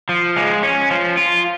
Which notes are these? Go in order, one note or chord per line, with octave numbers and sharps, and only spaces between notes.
F3
G#3
C#4
F3
F4